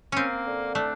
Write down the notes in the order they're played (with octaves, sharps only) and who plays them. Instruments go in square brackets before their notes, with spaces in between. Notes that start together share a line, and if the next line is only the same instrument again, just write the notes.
[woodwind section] A#3 [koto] C4 C#4
[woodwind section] D3
[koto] A3 [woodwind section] D4